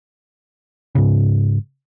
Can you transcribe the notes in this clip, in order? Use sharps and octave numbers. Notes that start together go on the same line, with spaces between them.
G#2 C#3